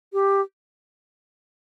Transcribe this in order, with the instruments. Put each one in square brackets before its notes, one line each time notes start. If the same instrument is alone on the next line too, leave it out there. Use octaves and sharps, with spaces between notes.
[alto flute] G4